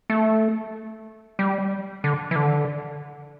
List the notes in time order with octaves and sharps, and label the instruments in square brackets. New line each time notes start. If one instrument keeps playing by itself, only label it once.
[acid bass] A3
G3
D3
E3
D3